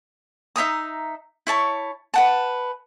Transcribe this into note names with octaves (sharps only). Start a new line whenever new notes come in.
D#4 E5 A#5 D#6
E4 C#5 A5 C#6
B4 F#5 A5